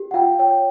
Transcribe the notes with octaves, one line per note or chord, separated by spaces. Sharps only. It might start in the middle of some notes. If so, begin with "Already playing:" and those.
Already playing: G4
F#5
F4 F5 G5
C#5 F5 G5